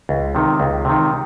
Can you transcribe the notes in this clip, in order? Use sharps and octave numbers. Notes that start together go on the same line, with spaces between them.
C#2
C3 D#3
C#2
C3 D#3